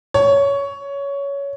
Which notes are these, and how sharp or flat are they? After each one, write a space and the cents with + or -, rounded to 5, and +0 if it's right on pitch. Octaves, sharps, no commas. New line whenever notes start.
C#5 +15